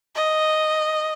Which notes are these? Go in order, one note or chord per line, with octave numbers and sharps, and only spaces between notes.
D#5